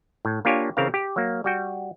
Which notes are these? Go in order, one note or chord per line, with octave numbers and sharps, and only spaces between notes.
A2
A#3 D4 F4 G4 C#5 G#5
C#3 E3 C4 A#4 F5
G4
F#3 A#3
G3 F#4 G5